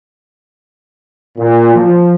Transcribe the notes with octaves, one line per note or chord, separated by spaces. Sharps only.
A#2
F3